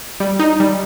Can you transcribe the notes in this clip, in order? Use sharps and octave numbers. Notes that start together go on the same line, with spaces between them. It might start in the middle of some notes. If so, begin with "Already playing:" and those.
G3
D#4
G3